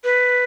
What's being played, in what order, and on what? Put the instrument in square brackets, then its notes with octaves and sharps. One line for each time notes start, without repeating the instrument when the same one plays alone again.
[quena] B4